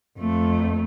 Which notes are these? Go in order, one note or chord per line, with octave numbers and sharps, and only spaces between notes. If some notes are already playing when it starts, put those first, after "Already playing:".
F2 A3